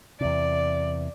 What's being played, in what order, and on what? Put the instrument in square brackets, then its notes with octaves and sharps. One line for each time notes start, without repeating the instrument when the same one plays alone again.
[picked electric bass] E2 C3 [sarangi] D5